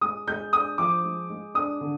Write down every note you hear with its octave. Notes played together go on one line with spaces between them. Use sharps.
G#3 D#6
G#3 G6
D4 D#6
F3 D6
G#3
G#3
D4 D#6
D3